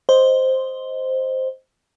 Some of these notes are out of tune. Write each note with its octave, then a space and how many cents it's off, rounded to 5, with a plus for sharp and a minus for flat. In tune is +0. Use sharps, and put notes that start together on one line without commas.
C5 +0 D#5 +0